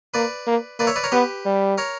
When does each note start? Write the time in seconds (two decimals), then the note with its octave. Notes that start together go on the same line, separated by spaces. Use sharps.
0.14 A#3 B4 D5
0.47 A#3
0.79 A#3 B4 D5
0.87 C#5 E5
0.96 B4 D5
1.04 A#4 C#5
1.12 B3 G4 B4
1.45 G3
1.78 A#4 C#5